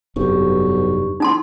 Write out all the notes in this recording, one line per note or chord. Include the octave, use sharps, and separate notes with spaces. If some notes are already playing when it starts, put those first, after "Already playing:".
F1 B1 G2 G4 C#6
D#4 E4 A5 C6